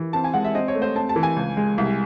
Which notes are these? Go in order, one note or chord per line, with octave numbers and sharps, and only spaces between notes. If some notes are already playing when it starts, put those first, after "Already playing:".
Already playing: E3
C4 A5
G#5
G#3 F#5
E5
C4 D#5
C#5
A3
C5
C4 A5
A5
E3
G#5
C#2
G#3
C2